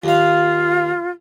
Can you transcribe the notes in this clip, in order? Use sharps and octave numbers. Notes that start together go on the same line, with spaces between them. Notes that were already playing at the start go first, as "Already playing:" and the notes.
D#2 F4 F5